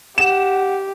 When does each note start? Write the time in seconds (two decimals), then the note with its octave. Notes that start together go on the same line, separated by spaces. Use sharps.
0.18 G4 F#5 E7